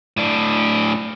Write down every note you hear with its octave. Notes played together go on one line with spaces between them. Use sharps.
A2 D4